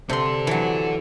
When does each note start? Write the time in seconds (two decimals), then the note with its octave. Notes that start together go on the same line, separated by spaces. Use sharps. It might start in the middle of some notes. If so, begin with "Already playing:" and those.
0.09 C3 D4 A4 C6
0.47 E3 F#3